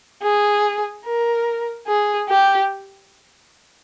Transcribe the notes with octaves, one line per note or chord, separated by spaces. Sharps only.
G#4
A#4
G#4
G4